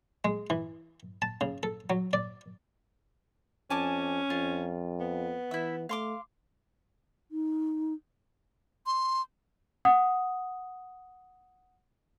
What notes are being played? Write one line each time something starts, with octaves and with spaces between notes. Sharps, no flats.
G#3
E3
A5
C#3
A4
F#3
D5
F2 C#4 G#5 A5 D6
F2 F4
B3
E3 E4 E5
A3 F5 C6 D6
D#4
C6
F#5 D#6